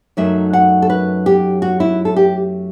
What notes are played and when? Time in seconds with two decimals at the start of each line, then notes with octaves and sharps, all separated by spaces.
0.17 F#2 F#3 A3 D#4 E5
0.53 F#5
0.82 A4
0.90 B4
1.26 G4
1.62 F#4
1.80 E4
2.05 A4
2.16 G4